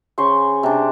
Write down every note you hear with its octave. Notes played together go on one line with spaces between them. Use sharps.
C#3 C5 C6 C#6
C3 D4